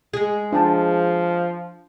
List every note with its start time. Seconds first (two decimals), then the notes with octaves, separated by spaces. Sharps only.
0.13 G#3 G#4
0.53 F3 D4 G5 A5